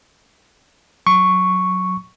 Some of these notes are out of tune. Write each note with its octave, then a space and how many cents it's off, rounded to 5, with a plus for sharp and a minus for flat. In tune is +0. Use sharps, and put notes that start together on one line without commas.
F#3 +0 C#6 +0